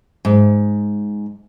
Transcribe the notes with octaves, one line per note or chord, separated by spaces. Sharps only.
G#2